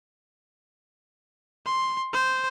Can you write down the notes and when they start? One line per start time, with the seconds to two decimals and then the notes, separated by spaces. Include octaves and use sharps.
1.66 C6
2.13 C5